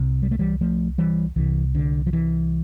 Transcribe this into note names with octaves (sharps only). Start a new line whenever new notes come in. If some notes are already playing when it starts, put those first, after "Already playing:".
Already playing: C2 C3
G3
A3
E3 G3
F3 A3
E3 G3
C2 C3 E3
D3
F3
E3